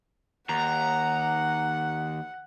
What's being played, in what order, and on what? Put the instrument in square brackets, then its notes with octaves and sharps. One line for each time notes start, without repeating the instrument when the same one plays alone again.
[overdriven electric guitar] D#2 [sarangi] F#5 [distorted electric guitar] A#5